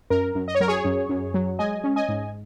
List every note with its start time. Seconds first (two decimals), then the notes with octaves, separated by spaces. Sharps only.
0.10 F#2 A#4
0.35 F#2
0.48 D#5
0.55 C#5
0.60 F#3 A#4
0.68 G#4 C#5
0.85 F#2
1.09 F#2
1.34 F#3
1.59 G#3 D#5 G#5
1.84 C#4
1.96 D#5 G#5
2.08 G#2